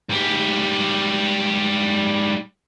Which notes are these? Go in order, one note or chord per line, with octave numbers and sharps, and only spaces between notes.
G#2 G3